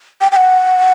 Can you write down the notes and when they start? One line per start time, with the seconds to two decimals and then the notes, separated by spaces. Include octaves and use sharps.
0.21 G5
0.32 G5
0.36 F#5